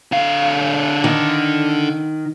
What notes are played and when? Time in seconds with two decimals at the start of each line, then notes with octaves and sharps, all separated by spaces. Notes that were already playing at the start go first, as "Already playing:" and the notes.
0.12 D3 F5
1.04 D#3